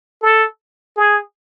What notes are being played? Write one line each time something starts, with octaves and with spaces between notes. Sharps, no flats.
A4
G#4